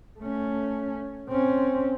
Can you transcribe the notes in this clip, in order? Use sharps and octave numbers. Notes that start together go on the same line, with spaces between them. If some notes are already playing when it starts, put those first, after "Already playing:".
A3 C#4
C4 C#4